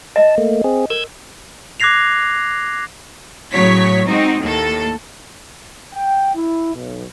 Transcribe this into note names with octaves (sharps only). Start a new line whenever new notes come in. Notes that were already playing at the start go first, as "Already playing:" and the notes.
D#5 E5 A5
A3 A#3
C4 G#4
A#4 E6 G6 G#6
D6 F#6 G#6 A#6 C7 F7
A2 C#3 F#3 C#5 B6
G#3 C4 D#4 F#4
D#2 A2 A#3 A4
G5
E4
B1